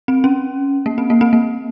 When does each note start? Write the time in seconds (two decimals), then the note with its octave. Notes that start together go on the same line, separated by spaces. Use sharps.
0.08 C4
0.24 C#4
0.86 A#3
0.98 C4
1.10 A#3
1.21 C4
1.33 A#3